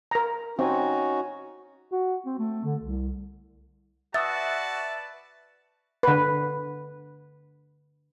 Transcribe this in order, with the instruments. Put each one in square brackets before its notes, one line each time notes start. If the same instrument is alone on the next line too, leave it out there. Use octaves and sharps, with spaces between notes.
[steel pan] A#4 A#5
[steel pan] C4 [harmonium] C#4 D#4 F#4
[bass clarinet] F#4
C4
A3
D3
C2
[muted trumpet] F#4 [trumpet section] B4 D5 A5 [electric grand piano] E5 [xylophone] D#6 E6 A6
[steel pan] D3 B4